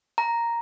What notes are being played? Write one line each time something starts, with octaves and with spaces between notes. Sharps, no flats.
A#5